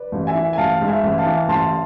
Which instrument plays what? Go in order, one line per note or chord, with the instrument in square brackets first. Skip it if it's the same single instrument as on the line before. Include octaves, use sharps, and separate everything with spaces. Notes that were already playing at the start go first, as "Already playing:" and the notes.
Already playing: [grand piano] B4 D5
[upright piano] A1
[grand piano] E5 G#5
[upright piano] E3
[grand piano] G#5
[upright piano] A1 [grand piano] F5 A5
[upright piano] G#2
[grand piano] E5 G#5
[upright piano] A1
[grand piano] F5 A5
[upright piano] E3
[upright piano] A1 [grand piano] A5 C6